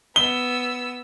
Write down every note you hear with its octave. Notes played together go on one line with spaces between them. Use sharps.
B3 E6 G7